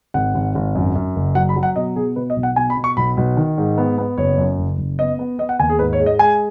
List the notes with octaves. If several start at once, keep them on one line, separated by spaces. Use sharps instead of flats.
G#1 F#5
G#1
G#1
F#2
F#2
F#1
F#3 F#5
B5
F#3
F#5
B2 D#5
B2 G#4
B2 B4
D#5
B1
F#5
B2 G#5
B5
B2
C#6
B1 B5
B1
D#3
G#2
B3
B3
F#1 C#5
F#2
F#1
F#1
B3 D#5
B3
B3 D#5
F#5
D#2 G#5
G#4
G#2 B4
C#5
G#3
D#5
G#3 G#5